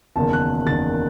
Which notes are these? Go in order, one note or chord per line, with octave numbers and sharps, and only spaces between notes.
F#1 E2 D#3 A5
F#6
F#1 E2 D#3 A6